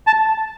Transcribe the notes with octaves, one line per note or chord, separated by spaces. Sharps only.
A5